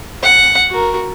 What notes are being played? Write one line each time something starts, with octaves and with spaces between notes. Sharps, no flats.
F#5
F#4 A#4